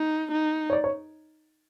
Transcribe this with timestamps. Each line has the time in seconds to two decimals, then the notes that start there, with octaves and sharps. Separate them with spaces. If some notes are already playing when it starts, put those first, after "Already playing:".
Already playing: D#4
0.32 D#4
0.70 C#5
0.73 D5
0.84 C#5